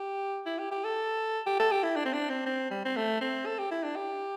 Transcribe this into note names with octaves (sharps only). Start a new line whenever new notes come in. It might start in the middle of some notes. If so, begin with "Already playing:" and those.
Already playing: G4
E4
G4
G4
A4
G4
A4
G4
E4
D4
C4
D4
C4
C4
G3
C4
A3
C4
A4
G4
E4
D4
G4